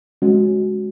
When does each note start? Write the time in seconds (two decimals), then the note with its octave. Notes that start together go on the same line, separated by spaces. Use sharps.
0.22 G#3 C#4 F#4